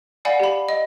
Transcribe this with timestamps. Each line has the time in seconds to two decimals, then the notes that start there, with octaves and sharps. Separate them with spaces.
0.25 D5 F5 F#5 G#5 B5
0.40 G4 B5
0.69 D#5